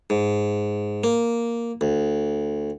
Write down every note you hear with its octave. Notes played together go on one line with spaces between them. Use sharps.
G#2
A#3
D2